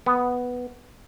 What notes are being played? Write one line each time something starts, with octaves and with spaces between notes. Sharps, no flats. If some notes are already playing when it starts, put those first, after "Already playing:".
B3